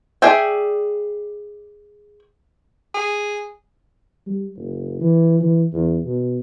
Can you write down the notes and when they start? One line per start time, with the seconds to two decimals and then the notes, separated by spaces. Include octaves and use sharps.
0.22 G#4 D5 E5 G5 G#5
2.94 G#4
4.27 G3
4.56 F#1
5.00 E3
5.41 E3
5.73 E2
6.04 B2